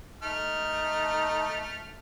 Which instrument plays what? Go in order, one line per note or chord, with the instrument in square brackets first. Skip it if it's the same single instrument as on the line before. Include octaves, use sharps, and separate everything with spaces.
[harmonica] A3 F6 [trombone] D#4